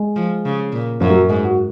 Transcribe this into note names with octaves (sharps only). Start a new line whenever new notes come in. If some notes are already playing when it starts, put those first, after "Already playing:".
Already playing: G#3
F3
C#3
A#2
F#2 F3
F#3
G#2 G#3
F#4